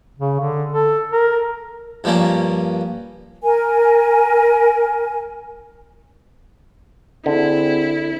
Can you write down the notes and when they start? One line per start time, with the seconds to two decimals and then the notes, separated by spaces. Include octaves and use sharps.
0.18 C#3
0.40 D3
0.72 A4
1.12 A#4
2.04 G2 F3 G3 A#3 C#4
3.43 A#4 G#5
7.26 D3 C4 D4 E4 G#4